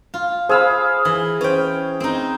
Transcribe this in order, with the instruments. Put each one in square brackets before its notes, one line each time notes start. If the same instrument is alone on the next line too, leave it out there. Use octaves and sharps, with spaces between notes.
[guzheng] F4
[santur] G#4 F5 B5 [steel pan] C5 E6
[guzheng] E3
[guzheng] C#4 G5 [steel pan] B4 C5
[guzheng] C4 D#4